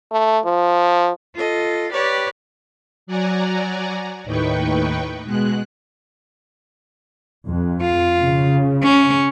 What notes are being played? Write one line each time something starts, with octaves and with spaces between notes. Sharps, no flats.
A3
F3
F4 A4 D#5
G4 B4 C#5 D5
F#3 D5 F#5 G#5 A#5
D#2 A2 D#3 B4 G5 C#6
B2 G#3 F#6
F2
F4
C#3
C#4